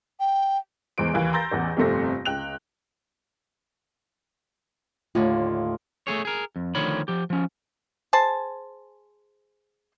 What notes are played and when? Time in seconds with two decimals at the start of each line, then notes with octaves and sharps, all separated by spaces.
0.20 G5
0.98 E2 E3 G#3 C5 C6 D7
1.14 D#2 E3 F5
1.33 A#5 C6 E6 G6 A6 A#6
1.51 A1 E2 E3 F#5
1.77 G1 F2 C3 A3 C5 A#6
2.25 C#2 G5 F#6 F7
5.15 D#2 A2 D3 F4
6.07 A3 B3 G#4 C#5
6.25 G#4 A#4
6.56 F2
6.75 D2 D3 D#3 F3 C#5 B5
7.08 F3 G4
7.30 F3 C#4
8.13 G#4 C5 A5